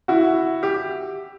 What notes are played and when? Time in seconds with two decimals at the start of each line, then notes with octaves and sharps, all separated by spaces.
0.08 E4 F#4
0.63 G4